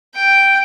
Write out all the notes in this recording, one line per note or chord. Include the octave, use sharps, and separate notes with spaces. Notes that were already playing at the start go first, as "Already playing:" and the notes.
G5